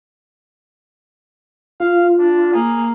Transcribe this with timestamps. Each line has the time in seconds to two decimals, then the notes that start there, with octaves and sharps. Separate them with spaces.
1.80 F4 F5
2.19 D4
2.53 A#3 G#4